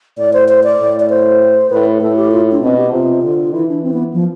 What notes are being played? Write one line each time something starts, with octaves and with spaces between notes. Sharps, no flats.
A2 D5
C5
C5
D5
A2
D5
C5
A2 B4
A2 A4
G4
F4
D4
B2 C4
G4
C3 F4
D3
E3 E4
D4
C4
B3
F3